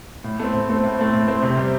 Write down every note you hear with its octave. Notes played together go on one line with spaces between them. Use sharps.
A2
A3 C4
A2
A3 C4
A2
A3 C4
A2
A3 C4
C3
G3 C4